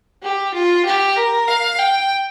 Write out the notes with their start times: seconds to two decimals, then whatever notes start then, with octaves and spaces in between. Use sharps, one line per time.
0.22 G4
0.54 F4
0.85 G4
1.16 A#4
1.48 F5
1.79 G5